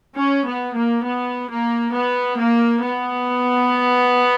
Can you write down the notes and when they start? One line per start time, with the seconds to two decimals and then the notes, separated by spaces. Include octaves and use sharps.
0.15 C#4
0.45 B3
0.76 A#3
1.05 B3
1.50 A#3
1.94 B3
2.39 A#3
2.83 B3